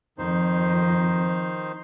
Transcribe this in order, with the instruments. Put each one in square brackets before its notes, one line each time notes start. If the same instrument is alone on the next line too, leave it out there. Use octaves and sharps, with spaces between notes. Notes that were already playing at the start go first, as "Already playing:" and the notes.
[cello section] F2 [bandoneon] D#3 D#4 C5